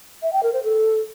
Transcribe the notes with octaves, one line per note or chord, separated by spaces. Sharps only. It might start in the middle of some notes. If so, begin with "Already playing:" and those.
E5
G5
A#4
C5
A4